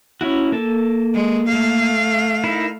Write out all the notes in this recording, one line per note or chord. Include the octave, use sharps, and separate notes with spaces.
C#4 E4 F#4
A#3 A4 A5
G#3
A3 F5
D#4 E4 A#4